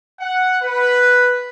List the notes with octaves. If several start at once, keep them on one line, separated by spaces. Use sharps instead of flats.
F#5
B4